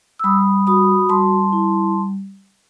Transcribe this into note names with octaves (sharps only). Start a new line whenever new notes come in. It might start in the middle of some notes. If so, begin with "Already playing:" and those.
E6
G3 B5 D#6
F#4 B5 D#6
G3 A5 C6
E4